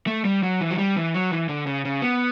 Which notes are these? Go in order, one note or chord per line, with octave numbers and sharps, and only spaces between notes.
A3
G3
F#3
E3
F#3
G3
E3
F#3
E3
D3
C#3
C#3
B3